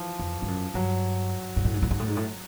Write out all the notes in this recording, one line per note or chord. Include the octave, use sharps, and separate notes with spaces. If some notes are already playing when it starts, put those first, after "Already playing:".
Already playing: E3 F3
F2
G2
F#2
G2 F#3
G#2
A2
G#2
A2
G#2
A2
G#2
A2